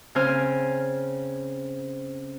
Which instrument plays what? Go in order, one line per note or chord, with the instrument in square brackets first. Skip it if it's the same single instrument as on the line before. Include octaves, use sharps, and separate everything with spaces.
[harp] C#3 C4 C5 G#5 F6